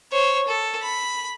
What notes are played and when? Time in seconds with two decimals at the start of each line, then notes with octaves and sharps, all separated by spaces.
0.12 C5 C#5
0.48 A4
0.82 B5